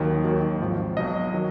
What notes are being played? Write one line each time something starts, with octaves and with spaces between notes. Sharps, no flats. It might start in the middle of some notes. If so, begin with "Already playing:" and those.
Already playing: D#2 D#3 F#3
D#2 D#3 F#3
G#1 G#2 F3
B1 B2 F#3 D#5
D#3 F#3